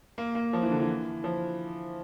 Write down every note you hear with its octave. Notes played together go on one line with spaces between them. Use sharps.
A#3
A#3
F3
E3
D3
E3
F3